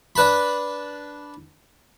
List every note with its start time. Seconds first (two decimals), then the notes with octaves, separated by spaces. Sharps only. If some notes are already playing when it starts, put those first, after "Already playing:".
0.16 D4 B4 A5 B5